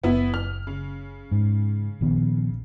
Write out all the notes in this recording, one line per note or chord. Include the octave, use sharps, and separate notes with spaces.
F#1 B3 E4
F6
C#3
G#2
A#1 D#3 B3